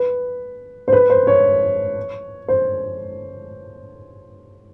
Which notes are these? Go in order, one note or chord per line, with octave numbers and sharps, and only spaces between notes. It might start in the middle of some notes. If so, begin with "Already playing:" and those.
Already playing: B4
C5
B4
C5
C#5
C5